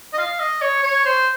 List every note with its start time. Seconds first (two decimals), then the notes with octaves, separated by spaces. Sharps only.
0.13 D#5
0.18 F5
0.40 D#5
0.62 C#5
0.83 C#5
1.06 C5